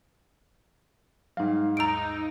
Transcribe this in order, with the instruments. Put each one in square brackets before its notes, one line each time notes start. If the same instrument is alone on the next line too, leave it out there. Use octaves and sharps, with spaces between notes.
[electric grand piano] G#2 F5 [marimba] F#3 G3 D#4
[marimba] D#2 E6 A6 [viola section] D#4 [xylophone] A#5 D7